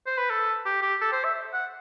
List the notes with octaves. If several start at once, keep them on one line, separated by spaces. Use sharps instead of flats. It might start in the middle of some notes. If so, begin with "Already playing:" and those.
C5
B4
A4
G4
G4
A4
C5
E5
F#5